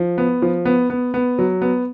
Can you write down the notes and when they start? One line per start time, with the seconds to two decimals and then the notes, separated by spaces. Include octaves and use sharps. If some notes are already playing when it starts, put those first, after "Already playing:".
Already playing: F3
0.18 B3
0.42 F3
0.65 B3
0.90 B3
1.14 B3
1.39 F#3
1.62 B3